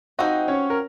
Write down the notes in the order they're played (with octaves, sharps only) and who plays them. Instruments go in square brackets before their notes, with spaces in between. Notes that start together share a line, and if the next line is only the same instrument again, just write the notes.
[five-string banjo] F3 C4 F#4 [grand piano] D#4 D#5
[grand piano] C#4 C#5
A#4